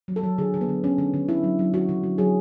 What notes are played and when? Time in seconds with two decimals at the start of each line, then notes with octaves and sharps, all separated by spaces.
0.08 F#3
0.16 A4
0.23 F#3
0.38 D3 G#4
0.54 D3
0.61 B3
0.69 D3
0.84 D3 C#4
0.98 D3
1.14 D3
1.29 D3 E4
1.44 F#3
1.59 F#3
1.74 D3 F#4
1.89 D3
2.03 F#3
2.18 F#3 G#4